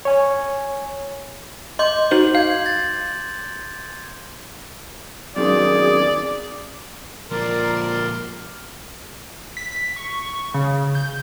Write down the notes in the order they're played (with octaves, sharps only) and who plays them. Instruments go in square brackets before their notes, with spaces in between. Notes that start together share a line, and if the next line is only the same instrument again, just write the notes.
[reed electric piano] C#5 G#5
[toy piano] D#5 [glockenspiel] C6 D6 G6
[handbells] D#4 F#4 C5 [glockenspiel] F#7
[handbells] F5 [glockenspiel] G6 G#6
[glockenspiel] A6
[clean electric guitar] F#2 C3 D#3 [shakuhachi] G#4 [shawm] D5
[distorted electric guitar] F2 A#2 [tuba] F3 [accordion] A#4 D5 C6
[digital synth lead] B6
C#6
C#3
G6